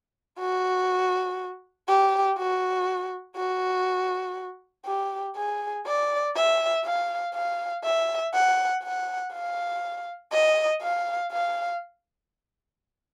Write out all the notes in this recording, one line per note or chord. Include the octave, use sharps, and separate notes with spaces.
F#4
G4
F#4
F#4
G4
G#4
D5
E5
F5
F5
E5
F#5
F#5
F5
D#5
F5
F5